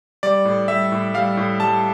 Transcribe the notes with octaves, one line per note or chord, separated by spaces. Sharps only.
G3 D5
A2
G3 E5
A2
G3 F5
A2
G3 A5